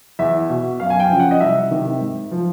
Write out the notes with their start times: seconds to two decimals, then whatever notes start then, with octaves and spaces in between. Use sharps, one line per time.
0.19 E2 E5
0.49 B2
0.80 F#2 F5
0.90 G#5
1.00 G5
1.10 C#3 F3
1.20 F#5
1.31 D#5
1.40 C2 E5
1.71 C3 D#3
2.01 G#2
2.31 F3